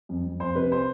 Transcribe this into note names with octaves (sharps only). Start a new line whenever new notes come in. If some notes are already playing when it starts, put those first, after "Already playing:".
F2
F2
F2 C5
C3 B4
C5